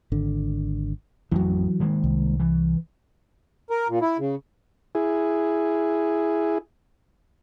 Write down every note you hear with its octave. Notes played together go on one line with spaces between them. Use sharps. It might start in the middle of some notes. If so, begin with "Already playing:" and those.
G#1 D3
A1 F2 E3 F#3
D#3 G#3 A#3
C2
E3
A#4
A#2
E4
C#3
E4 G#4